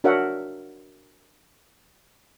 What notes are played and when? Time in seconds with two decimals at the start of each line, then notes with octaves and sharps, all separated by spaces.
0.04 D4 F#4 A#4 C#5 E5 F#5